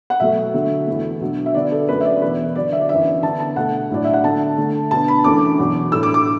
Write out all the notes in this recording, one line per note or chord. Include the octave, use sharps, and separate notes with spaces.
F#5
B2 F#3 A3 E5
D3 F#3 A3
E2 E3 A3
B2 F#3 D4
E5
D3 B3 D4 D5
A4
F#2 F#3 A3 B4
E5
D5
E2 B2 B3 B4
D3 F#3 D4 D5
E5
D5
F#2 E3 B3 D4 E5
D3 B3 D4 A5
A5
B2 A3 D4 F#5
A2 F#3 D4 D5
E5
F#5
D3 A3 D4 A5
D3 A3 D4
B2 B3 D4 A5
B5
F#2 E3 A3 D4 D6
E2 B2 F#3
A2 A3 D4 E6
D6
D6